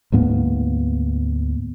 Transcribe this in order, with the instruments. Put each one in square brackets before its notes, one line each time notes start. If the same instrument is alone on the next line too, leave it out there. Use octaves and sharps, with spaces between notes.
[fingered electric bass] D2 G#2 A#3 B3